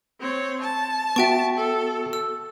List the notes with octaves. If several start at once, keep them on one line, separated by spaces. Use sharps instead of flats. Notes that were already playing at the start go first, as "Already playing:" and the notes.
C4 C#5
A5
B3 F#4 E5 G5 C#6
A4
E6